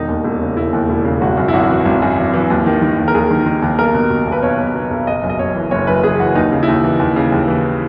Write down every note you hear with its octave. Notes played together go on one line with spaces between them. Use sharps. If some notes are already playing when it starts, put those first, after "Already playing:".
Already playing: E1 D#3 D#4
D#2
E1
C#3
E1 E4
D#2
E1
C#3
G#1 F#4
F#2
E4
G#1 F#4
E3
G#1
F#2
G#1
E3
D#2
D#3
D#3
D#2
A#4
D#2 G#4
D#3
D#3
D#2
B1 A#4
B2
B2
B1
B4
B1 C#5
B2
B2
B1
F#1 D#5
F#2
D#5
F#1 C#5
E3
F#1 C#5
F#2 B4
F#1 G#4
E3 F#4
D#2 D#4
C#3
E4
D#2 D#4
E3
D#2
C#3
D#2
E3